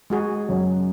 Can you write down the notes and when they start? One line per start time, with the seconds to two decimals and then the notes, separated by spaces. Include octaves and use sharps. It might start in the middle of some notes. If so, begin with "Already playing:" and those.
0.10 G#3 F#4 G#4
0.49 F#2